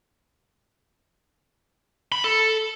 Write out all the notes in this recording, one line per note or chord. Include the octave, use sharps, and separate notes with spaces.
B5
A4